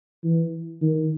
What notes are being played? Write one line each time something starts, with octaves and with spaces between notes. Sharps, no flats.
E3
D#3